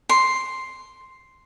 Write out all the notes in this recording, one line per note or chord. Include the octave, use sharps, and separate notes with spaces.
C6